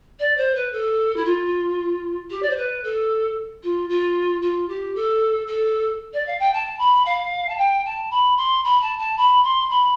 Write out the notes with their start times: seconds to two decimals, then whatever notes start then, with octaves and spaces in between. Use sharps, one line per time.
0.19 D5
0.36 C5
0.54 B4
0.72 A4
1.16 E4
1.25 F4
2.30 G4
2.42 D5
2.49 C5
2.56 B4
2.83 A4
3.63 F4
3.89 F4
4.41 F4
4.68 G4
4.95 A4
5.47 A4
6.13 D5
6.26 F5
6.39 G5
6.53 A5
6.78 B5
7.05 F5
7.48 A5
7.57 G5
7.85 A5
8.10 B5
8.37 C6
8.64 B5
8.81 A5
8.98 A5
9.17 B5
9.43 C6
9.70 B5